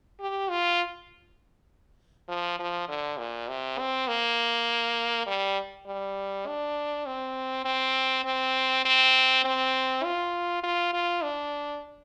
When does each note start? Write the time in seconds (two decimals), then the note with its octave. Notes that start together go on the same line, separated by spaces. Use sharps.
0.20 G4
0.50 F4
2.28 F3
2.59 F3
2.89 D3
3.18 A#2
3.48 C3
3.79 C4
4.08 A#3
5.27 G3
5.86 G3
6.47 D4
7.06 C4
7.65 C4
8.25 C4
8.85 C4
9.45 C4
10.04 F4
10.63 F4
10.93 F4
11.23 D4